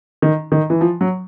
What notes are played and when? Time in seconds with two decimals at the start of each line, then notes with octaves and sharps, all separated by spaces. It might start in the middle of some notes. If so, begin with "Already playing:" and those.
0.22 D#3
0.52 D#3
0.70 E3
0.81 F3
1.01 F#3